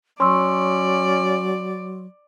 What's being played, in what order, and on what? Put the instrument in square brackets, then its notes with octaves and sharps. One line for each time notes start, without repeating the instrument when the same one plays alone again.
[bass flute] F#3 [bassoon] C#4 [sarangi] D5 [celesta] C6 C#6 E6